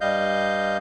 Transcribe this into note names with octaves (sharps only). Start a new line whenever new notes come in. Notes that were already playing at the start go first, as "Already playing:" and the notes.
G2 G3 D#5 F5 G6